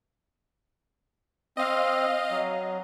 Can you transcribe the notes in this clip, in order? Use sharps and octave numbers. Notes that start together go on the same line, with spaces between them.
C4 D#5 F5
F#3